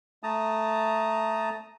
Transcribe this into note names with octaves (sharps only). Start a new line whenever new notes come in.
A3 A5 A#5 D#6